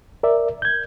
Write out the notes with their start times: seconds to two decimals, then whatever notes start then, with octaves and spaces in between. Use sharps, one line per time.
0.23 A#4 D5 E5
0.62 G6 G#6